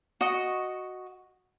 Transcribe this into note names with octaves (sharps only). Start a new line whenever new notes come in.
F#4 D#5 C#6